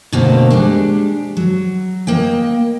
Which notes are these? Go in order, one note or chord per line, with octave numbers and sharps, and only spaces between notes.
B2 D3 A3 A#3 C4
G3 G#3 D4
F#3
A#3 D#5 G5